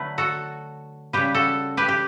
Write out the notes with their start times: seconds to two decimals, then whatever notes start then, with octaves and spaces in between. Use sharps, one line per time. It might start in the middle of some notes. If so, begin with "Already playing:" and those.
Already playing: D3 F#3 A3 B4
0.18 F#4 A4
1.13 C#3 G3 G4 B4
1.34 F#4 A4
1.77 G4 B4
1.88 G4